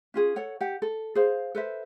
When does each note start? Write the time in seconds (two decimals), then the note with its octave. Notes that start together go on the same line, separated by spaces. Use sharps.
0.14 C#4 F4 G#4
0.36 A4 C#5 F#5
0.61 G4 F#5
0.82 A4
1.15 G#4 C5 F5
1.55 A4 B4 C5 E5